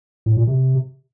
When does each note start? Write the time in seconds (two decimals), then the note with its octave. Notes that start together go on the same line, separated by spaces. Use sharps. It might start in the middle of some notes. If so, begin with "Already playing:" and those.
0.26 A2
0.37 A#2
0.47 C3